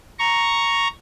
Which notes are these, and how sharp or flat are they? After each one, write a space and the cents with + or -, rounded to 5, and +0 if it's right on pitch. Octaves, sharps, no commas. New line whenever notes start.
A#5 +0 C#6 +0